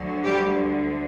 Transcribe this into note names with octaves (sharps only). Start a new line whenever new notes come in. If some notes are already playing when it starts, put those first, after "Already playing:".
Already playing: D2 D3 F#3
G3 G4